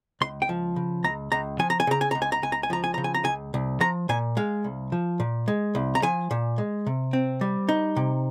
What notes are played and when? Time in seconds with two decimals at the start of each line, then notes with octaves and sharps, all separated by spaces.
0.21 C#2 C6
0.42 G5
0.49 F3
0.76 C#3
1.04 C#2 A#5
1.32 C#2 A#5
1.59 F3 G#5
1.70 A#5
1.80 G#5
1.87 C#3 A#5
2.01 G#5
2.11 C#2 A#5
2.22 G#5
2.32 A#5
2.42 C#2 G#5
2.52 A#5
2.63 G#5
2.70 F3 A#5
2.84 G#5
2.94 C#3 A#5
3.04 G#5
3.15 A#5
3.25 C#2 G#5
3.54 C2
3.81 F3 A#5
4.09 A#2 G#5
4.37 G#3 F5
4.64 C2
4.92 F3
5.20 A#2
5.48 G#3
5.75 C2
5.95 A#5
6.02 F3 G#5
6.31 A#2
6.58 G#3
6.86 C3
7.13 C4
7.41 G3
7.69 D#4
7.97 C3